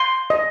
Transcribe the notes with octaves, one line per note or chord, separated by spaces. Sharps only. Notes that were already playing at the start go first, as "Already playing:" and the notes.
Already playing: C6
D#5